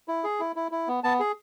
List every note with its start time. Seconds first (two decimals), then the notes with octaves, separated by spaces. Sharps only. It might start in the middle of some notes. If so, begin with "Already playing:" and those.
0.08 E4
0.24 G#4
0.40 E4
0.56 E4
0.72 E4
0.88 B3
1.04 B3 A5
1.20 G#4